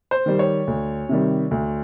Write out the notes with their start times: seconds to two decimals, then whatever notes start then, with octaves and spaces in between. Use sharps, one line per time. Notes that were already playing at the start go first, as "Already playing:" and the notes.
0.11 C5
0.26 D#3 G3
0.39 C#5
0.67 D2
1.09 C3 D#3 G3
1.51 D2